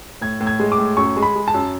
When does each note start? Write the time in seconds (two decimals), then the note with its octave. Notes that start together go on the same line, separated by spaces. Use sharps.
0.21 A2 G#6
0.41 A2
0.47 G#6
0.59 G#3
0.72 D6
0.78 A2
0.97 F#2 C#6
1.17 G#3
1.22 B5
1.36 G#3
1.48 A5
1.54 F#2